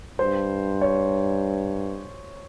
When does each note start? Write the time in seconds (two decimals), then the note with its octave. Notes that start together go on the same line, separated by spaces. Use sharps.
0.19 G2 C5
0.81 C#5